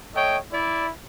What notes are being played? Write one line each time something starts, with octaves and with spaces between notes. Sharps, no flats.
A3 C#5 D#5 G5
E4 D5